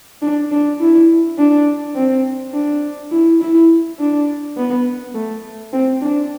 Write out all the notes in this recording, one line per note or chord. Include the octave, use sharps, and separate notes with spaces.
D4
D4
E4
D4
C4
D4
E4
E4
D4
B3
A3
C4
D4